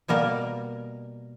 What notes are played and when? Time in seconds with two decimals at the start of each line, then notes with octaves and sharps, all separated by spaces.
0.08 B2 G3 A#3 A#4